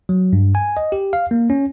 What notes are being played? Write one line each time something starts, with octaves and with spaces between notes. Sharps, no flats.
F#3
G2
G#5
D#5
G4
F5
A#3
C#4